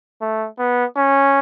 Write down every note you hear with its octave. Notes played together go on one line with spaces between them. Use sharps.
A3
B3
C#4